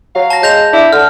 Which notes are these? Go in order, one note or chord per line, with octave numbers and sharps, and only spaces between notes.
F#3 F5
A5 A#6
G#3 G6 A#6 F7
D4 E4
D3 D4 F6